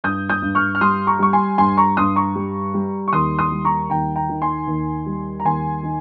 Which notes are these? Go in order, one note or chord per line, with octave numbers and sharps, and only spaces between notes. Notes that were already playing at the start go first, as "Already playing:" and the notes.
G2 D#6 G6
D#6 G6
G2
C#6 F6
F6
G3 C6 D#6
A#5 C#6
G3 C#6
G#5 C6
G2 G#5 C6
A#5 C#6
G2 C6 D#6
A#5 C#6
G3
G3
C#6
D#2 C6 D#6
C6 D#6
G3
A#5 C#6
D#2 G5 A#5
G5 A#5
D#3
G#5 C6
D#2
G3
A#5
D#2 G#5 C6
D#3